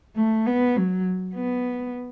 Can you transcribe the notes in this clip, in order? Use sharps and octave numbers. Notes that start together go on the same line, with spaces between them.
A3
B3
F#3
B3